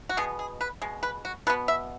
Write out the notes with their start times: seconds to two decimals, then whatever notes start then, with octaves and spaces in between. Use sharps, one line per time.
0.09 F#4
0.17 B2 G#3 B3 G#4
0.39 G#4
0.61 B4
0.82 B2 G#3
1.03 B4
1.25 F#4
1.47 B2 B4
1.50 B3
1.68 E5